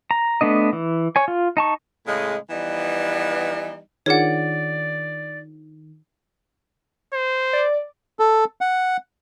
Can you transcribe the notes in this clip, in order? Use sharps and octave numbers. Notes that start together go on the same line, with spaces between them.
A#5
A3 B3 D4 D#5
E3
C#5 G#5
F4
D#4 A5 C#6
A2 C#3 G#3
E3 F3 G3 B3 D#4
D#3 D4 F4 G#4 C#5 D5 F#5
C5
D5
A4
F#5